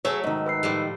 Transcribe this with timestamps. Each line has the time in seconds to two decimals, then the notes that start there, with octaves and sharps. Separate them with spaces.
0.05 F#3 A3 G#4 C#5 E5
0.23 G#2 D#3
0.46 B4 E6 C7
0.63 A2 F3 G3